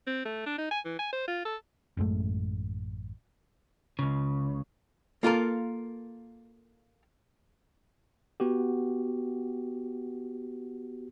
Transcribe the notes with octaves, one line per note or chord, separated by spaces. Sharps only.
C4
A3
D4
D#4
G#5
E3
G#5
C5
F4
A4
A1 F#2 G#3 A3
C#2 C#3
A#3 F4 A4 A#4
B3 F#4 G4